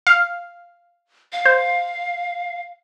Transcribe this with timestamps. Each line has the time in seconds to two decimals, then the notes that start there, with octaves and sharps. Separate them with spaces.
0.07 F5
1.33 F5
1.45 C5